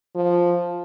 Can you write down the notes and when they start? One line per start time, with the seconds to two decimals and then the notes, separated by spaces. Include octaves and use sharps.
0.15 F3